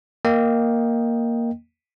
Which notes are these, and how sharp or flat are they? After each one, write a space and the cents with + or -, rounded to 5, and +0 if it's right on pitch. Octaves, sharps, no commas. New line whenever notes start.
A#3 +0 D#5 +0 G5 +0